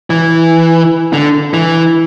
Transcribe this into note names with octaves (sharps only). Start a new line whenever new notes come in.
E3
D3
E3